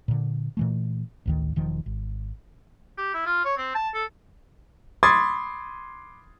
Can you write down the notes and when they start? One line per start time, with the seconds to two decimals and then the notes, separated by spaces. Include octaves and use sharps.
0.08 A#2 D3
0.57 A#2 E3 A3
1.26 A1 D2 D#3
1.56 E1 D#3 F3
1.86 G#1
2.98 G4
3.14 E4
3.26 F4
3.45 C#5
3.57 C4
3.75 A5
3.94 A4
5.03 B5 C6 D6 D#6 G#6 A6